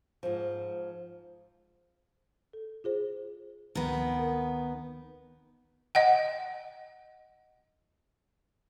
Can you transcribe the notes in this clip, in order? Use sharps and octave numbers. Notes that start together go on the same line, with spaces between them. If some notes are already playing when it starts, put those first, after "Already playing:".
G#2 F3
A4
F4 G#4 C5
D2 D#3 B3
A#4
D#5 F#5 G5